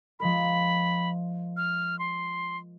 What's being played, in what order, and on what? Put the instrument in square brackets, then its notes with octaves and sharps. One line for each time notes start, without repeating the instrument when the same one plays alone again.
[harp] F3 G#3 A#4 [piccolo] B5
[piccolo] F6
C6